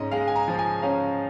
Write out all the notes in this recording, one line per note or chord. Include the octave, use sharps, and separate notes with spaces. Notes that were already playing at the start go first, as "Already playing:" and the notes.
Already playing: G#2 C#4 D#5
G#3 F5
G#5
A#5
F3
G#5
C#4 F5